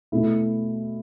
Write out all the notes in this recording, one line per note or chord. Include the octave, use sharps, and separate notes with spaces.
B2 A3 E4